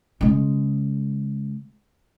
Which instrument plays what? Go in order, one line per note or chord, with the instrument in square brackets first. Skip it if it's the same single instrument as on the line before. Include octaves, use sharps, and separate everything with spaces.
[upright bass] C#3 G#3